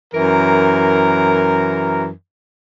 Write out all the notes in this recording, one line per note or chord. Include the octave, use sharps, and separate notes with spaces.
F#2 E3 A#4